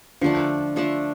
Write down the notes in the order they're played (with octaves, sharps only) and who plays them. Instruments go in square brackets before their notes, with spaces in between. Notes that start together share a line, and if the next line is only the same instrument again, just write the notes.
[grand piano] D3 [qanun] F3 A3 D4
[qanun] F3 A3 D4